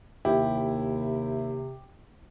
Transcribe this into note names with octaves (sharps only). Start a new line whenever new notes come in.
D#2 C3 E4 G4